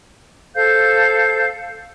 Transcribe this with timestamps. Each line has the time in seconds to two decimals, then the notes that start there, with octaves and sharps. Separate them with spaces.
0.55 A4 C5 F5 G6